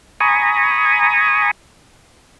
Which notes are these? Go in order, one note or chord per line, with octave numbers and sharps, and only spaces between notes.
G#5 A#5 B5 C#6 D#6